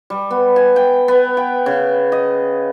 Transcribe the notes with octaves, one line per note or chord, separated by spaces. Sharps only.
G3
B3
G#5
G5
B3
G5
C#3
D#5